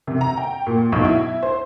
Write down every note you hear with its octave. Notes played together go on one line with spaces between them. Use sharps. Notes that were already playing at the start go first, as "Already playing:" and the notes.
C3
A#5
G5
A#2
B1
E4
C5